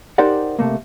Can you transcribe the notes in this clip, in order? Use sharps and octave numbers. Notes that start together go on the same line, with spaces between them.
D#4 G4 A#4 C5 D5 F#5
C3 A3 A#3